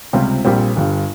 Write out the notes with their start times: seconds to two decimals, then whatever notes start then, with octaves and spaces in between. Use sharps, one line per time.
0.13 C#2 C3 G3 C4 F4
0.44 A#1 A#2 G3 C4 F4
0.76 G1 G2 G3